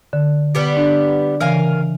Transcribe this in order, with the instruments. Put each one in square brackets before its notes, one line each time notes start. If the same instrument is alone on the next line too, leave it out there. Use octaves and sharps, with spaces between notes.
[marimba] D3
[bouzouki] G3 B3 G4
[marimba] D4
[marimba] C#3 E3 [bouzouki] A#4 F5 G#5